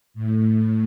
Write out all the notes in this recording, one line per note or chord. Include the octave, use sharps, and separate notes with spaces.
A2